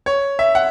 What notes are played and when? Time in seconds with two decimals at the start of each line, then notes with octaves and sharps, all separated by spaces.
0.06 C#5
0.39 E5
0.55 F#5